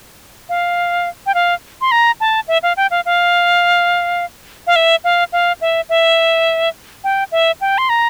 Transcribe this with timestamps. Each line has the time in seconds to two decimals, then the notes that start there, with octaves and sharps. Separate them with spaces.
0.49 F5
1.26 G5
1.34 F5
1.81 C6
1.92 A#5
2.20 A5
2.48 E5
2.63 F5
2.77 G5
2.91 F5
3.06 F5
4.67 F5
4.76 E5
5.04 F5
5.33 F5
5.61 E5
5.89 E5
7.04 G5
7.32 E5
7.61 G5
7.78 C6
7.89 A#5